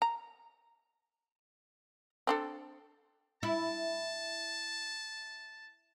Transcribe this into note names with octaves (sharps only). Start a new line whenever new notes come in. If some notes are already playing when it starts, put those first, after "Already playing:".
A#5
C4 D4 A4
E4 A5